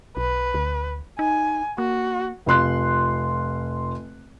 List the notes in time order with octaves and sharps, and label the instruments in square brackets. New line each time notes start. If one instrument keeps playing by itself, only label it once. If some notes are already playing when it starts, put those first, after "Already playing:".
[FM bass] B1 [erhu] B4
[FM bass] D2
[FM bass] D#4 [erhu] G#5
[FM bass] A#3 [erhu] F#4
[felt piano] F1 F4 C6 F#6